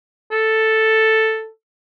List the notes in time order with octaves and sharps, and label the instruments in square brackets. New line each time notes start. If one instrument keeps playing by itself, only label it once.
[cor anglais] A4